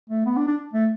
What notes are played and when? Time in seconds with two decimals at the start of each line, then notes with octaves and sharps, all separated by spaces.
0.09 A3
0.25 B3
0.37 D4
0.47 D4
0.73 A3